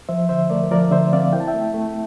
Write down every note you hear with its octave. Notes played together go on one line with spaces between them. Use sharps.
F3 C5 E5
D3 C5 E5
A3 A#4 D5
F3 A#4 D5
D3 C5 E5
C4 D5 F5
E4 G5
A5
E5 G5
A3
A3